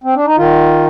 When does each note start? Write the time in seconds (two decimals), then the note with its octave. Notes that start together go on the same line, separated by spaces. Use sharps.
0.04 C4
0.15 D4
0.25 D#4
0.37 D#3 F4